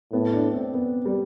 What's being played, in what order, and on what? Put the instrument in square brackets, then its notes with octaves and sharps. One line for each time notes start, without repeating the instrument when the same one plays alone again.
[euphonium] A2 [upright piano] B3
[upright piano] D4
C4
B3
G3